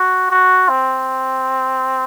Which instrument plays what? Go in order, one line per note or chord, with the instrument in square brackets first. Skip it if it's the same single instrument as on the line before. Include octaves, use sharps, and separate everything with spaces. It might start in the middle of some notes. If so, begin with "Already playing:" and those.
Already playing: [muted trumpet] F#4
F#4
C4